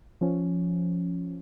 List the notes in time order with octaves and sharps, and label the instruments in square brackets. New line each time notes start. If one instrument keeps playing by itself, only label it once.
[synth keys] F3 C#4